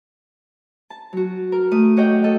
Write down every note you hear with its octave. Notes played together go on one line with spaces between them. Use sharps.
A5
F#3 F#4
A#4
A3 D#6
F#4 G4 C#5 D#5 F#5 G5
A4 D#5